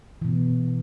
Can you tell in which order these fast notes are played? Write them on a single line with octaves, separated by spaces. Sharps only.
E3 B2 B3